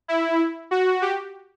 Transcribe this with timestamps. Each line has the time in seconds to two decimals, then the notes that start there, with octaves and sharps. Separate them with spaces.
0.08 E4
0.71 F#4
1.02 G4